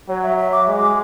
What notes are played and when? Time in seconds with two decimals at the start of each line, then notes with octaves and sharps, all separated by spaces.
0.08 F#3 C#5
0.23 E5
0.38 E5
0.52 D6
0.67 G#3
0.82 D6